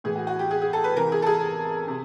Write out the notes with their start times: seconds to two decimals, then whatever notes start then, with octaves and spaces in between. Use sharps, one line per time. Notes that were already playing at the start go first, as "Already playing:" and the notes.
0.04 A2 E3 G#4
0.16 F#4
0.27 F#4
0.39 G4
0.51 G#4
0.62 G#4
0.73 A4
0.84 B4
0.96 C3 E3 A#4
1.12 G#4
1.22 A4
1.26 G#4
1.87 C3